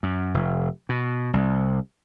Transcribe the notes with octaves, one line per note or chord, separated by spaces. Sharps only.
F#2
F1
B2
C2